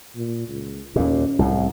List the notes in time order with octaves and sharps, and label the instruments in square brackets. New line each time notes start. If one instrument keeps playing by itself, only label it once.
[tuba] A#2
C#2
[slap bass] D#2 A#2 [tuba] C#4
[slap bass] C2 A2